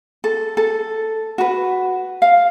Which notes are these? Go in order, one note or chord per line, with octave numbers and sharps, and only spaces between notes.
A4
A4
F#4 B4
F5